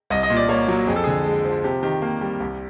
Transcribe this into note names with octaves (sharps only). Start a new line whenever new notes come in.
C2 D#5
D#5
A#2
D5
A#3 C#5
F#3
F2 G#4
A4
D3 G#4
G#3
F3
C3 G4
D#3 G4
A#3
G3
C2